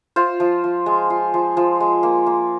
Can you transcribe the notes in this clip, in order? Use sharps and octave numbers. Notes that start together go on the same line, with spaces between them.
F4 C5
F3
F3
G#3
F4
F3
F3
G#3
A#3
A#3